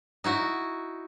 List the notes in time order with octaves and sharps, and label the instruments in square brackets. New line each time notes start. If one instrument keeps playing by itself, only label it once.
[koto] D#4 E4 F#4